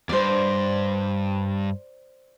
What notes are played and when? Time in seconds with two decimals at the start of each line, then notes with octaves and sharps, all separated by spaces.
0.09 E2 G2 C5 D5